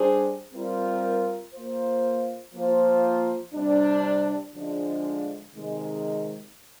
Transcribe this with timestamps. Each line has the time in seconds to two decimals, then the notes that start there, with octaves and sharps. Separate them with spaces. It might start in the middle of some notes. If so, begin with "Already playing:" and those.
Already playing: G3 D4 G#4 C5
0.54 G3 C4 F4 A#4
1.54 A#3 F4 C5
2.53 F3 A#3 F4 C5
3.54 C3 G3 D4
4.54 D3 F3 G#3 D4
5.54 C3 D#3 G#3